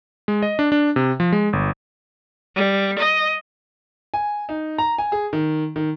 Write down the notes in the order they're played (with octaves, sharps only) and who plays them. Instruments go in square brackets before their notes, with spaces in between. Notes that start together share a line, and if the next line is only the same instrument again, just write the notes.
[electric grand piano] G#3
D#5
D4
D4
C3
F3
G#3
G1
[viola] G3
D#5
[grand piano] G#5
D#4
A#5
G#5
G#4
D#3
D#3